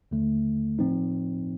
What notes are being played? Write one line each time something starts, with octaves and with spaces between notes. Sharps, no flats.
D#2 D3 A3
A2 F3 C4 D#4